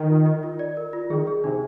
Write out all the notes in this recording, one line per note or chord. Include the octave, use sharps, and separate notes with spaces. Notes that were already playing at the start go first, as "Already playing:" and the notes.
Already playing: D#3
F4
D#5
F4
D5
A#4
F4
D#3 G#4
G#4
C3 D#4